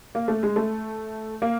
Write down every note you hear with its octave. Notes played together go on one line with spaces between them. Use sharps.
A#3
A3
G#3
A3
A#3